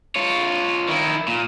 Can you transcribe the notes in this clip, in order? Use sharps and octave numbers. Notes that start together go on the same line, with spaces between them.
F4 C#5
D#3 E4
A#2